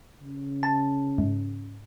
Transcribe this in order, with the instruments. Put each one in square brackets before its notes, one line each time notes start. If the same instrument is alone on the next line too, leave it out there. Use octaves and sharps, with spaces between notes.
[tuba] C#3
[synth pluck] A5
G#2